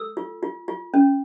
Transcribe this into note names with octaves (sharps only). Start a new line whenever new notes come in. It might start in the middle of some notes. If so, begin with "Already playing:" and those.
Already playing: A4 E6
F4
F4
F4
C#4